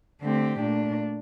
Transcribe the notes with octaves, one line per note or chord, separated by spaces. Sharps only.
D3 A3 C4 G4
A#2 A3 D4